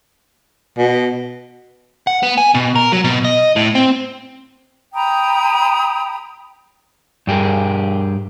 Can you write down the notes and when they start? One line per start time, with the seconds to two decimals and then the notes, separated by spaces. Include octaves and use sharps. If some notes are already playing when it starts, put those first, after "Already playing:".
0.78 B2
2.07 F#5
2.23 B3
2.38 G#5
2.55 B2
2.76 A#4
2.92 F#3
3.04 B2
3.25 D#5
3.56 A2
3.75 C4
4.94 G5 A#5 B5 D#6
7.27 G2 G4 G#4 A#4